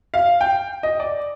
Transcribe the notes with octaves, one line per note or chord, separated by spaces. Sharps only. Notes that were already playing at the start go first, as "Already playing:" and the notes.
F5
G5
D#5
D5